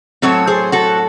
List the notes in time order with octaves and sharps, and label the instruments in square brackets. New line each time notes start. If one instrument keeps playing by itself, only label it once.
[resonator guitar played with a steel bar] A2 F#3 C4 A4 C#5
G#4 C5
F#4 A4